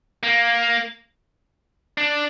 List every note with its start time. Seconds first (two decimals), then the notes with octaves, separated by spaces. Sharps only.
0.23 A#3
1.98 D4